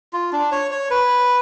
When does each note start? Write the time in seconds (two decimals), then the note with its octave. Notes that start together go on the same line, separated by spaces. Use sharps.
0.13 F4
0.32 D4
0.52 C#5
0.71 C#5
0.90 B4